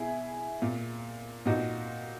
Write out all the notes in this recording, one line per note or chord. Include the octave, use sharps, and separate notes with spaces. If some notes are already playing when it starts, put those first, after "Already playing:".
Already playing: B2 E4 G#4
A#2
A#2 D#4 F#4